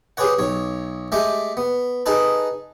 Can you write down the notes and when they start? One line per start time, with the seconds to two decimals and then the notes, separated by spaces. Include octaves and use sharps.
0.17 G4 G#4 B4 C#5 F#5
0.39 B1 C#5
1.12 G#3 A3 G4 E5
1.57 B3
2.06 D#4 G#4 A4 B4